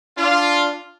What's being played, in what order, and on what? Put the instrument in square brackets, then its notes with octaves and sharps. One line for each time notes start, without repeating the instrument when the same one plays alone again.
[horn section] D4 F4